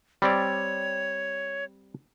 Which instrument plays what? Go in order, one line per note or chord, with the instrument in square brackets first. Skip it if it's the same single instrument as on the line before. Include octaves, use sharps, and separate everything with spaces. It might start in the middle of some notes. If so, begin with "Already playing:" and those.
[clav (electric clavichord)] G3 C4 D5 [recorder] C#5